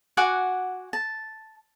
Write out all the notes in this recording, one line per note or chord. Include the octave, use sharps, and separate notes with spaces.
F#4 F#5 G#5 D6
A5